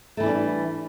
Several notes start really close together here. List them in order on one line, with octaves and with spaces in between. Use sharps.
A3 E3 E4 D4 G3